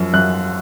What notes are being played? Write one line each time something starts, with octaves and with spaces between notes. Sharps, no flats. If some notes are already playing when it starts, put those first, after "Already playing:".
Already playing: F#2 F3
F#2 F#6